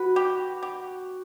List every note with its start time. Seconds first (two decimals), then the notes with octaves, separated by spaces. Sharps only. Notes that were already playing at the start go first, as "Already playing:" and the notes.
Already playing: F#4 B4
0.16 G4
0.63 G4